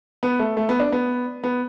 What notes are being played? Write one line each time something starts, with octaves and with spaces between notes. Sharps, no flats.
B3
A3
A3
B3
D4
B3
B3